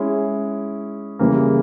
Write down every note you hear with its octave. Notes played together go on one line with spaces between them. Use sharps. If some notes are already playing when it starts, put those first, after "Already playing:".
Already playing: G#3 C#4 E4
C#3 E3 G3 A#3